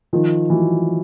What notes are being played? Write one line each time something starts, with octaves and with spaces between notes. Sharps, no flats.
D#3 F3
E3 F#3